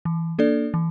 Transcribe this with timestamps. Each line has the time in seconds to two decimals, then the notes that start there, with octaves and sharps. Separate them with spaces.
0.05 E3
0.39 A#3 D4 A4 D5
0.74 E3